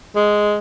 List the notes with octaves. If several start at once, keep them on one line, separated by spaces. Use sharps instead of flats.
G#3